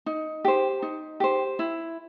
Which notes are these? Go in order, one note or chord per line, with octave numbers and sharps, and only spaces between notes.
D#4
G4 C5
D#4
G4 C5
E4